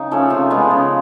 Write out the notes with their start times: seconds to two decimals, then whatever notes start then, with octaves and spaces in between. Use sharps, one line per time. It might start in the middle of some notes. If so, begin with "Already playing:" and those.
Already playing: C#3 D#4
0.11 F3 A3 C#4
0.30 C3 F4
0.50 F3 G#3 B3
0.71 C#3